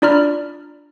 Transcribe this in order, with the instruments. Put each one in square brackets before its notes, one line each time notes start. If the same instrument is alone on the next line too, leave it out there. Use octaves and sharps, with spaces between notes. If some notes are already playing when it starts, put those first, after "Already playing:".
[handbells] D4 F4 D5 A#5 B5 F6